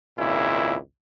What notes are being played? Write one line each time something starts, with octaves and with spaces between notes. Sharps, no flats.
G#1 C#2 A#2 E4